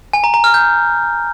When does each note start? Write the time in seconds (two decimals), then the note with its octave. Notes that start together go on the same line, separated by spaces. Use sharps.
0.13 G#5
0.24 A#5
0.34 A#5
0.44 F6
0.54 G6